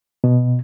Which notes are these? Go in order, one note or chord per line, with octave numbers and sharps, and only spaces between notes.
B2